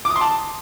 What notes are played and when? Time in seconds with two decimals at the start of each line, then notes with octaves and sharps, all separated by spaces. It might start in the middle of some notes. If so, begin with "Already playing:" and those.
0.05 D6
0.10 D#6
0.16 C6
0.21 A5